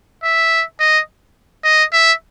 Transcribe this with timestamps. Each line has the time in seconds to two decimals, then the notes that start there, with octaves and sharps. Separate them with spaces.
0.24 E5
0.79 D#5
1.64 D#5
1.93 E5